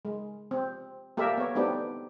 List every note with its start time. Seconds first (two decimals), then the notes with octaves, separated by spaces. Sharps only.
0.05 G#3
0.51 C4
1.17 A#3 G4 A4 A#4 E5
1.38 B3 C#5
1.55 A3 B3 C4 D4 D#4 G4